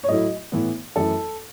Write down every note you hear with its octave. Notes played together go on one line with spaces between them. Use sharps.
C#5
A2 F#3 A3 E4 D#5
A2 E3 B3
F#2 E3 A3 E4 A4